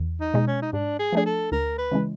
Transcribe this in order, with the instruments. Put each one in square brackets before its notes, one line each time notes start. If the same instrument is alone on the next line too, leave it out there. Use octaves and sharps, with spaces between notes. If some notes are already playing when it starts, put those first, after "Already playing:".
Already playing: [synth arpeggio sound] E2
[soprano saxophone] D#4
[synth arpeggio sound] B2 G#3
[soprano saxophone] C#4
D#4
[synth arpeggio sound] G#2 [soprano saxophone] D4
[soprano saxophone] G#4
[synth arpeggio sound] F3 A3 D4 [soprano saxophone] G#4
[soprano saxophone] A4
[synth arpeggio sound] D2 [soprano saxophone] A#4
[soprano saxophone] B4
[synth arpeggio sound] C#3 E3 G#3